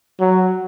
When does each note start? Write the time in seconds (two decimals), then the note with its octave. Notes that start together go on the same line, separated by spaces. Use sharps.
0.20 F#3